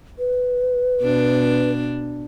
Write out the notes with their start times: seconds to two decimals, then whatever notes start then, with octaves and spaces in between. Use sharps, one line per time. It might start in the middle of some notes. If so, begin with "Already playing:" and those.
0.19 B4
1.01 B2 D4